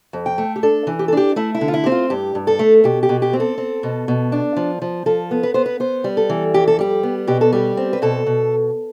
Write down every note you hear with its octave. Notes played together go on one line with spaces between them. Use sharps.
F2
G5
A3
G4
D4 A4
E3
G4
A4
D4 G4
A3 E4
E4
D3
F4
E4
C4 G4
F4
G2 G4
G2
A4
A3
B2 G4
G4
B2
G4
C4
A4
C4
B2
B2
D4
F3
F3
F3 A4
B3
B4
B3 C5
B4
B3 C5
G3
A4
E3
F2 G4
A4
G3 G4
B3
B2 G4
A4
G3 G4
C4
B4
B2 A4
B2